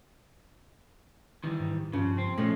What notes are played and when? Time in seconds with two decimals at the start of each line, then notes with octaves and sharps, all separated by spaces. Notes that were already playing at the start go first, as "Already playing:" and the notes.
1.44 D#3 E3 G3
1.60 G#2
1.93 G2 C#3 F3
2.18 C4
2.38 A#2 F3 G#3 A3 C#4